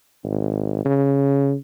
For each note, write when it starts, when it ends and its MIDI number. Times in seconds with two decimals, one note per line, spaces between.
0.24 0.84 32
0.85 1.54 49